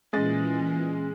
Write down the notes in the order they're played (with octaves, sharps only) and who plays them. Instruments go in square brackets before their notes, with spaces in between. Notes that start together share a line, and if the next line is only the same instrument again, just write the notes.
[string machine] A#2 E3 [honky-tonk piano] G#3 D#5 A6 [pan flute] C#4